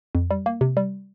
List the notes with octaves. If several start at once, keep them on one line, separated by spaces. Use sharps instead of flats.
F2
G3
A#3
C3
G3